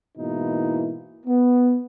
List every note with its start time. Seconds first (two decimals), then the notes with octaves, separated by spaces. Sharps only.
0.17 G#2 B2 E3 A#3 D#4 E4
1.25 B3